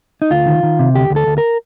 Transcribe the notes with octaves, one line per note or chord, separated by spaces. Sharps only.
D#4
D2 F4
D#3
D#3
C3
D2 G4
D2
A4
D2
A#4